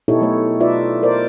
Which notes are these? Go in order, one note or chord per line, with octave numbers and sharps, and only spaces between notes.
B2 D#4 E4 G4 A4 C#5
F#3 A3 C#5
D#4 F4 B4 D5 E5
A#4 C5 D5